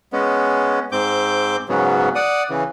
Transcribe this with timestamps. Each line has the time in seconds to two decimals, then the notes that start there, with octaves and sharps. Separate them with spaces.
0.13 G#3 B3 C#4
0.92 G#2 C4 D6 G6
1.69 G#2 C#3 F#3 B3
2.15 D5 F#5 D#6
2.50 C#3 E3